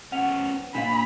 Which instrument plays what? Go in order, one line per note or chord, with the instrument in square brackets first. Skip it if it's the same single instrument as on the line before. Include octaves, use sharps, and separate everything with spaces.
[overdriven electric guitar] B3 C#4 [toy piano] F#5
[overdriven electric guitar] A#2 [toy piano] D4 F5 [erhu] B5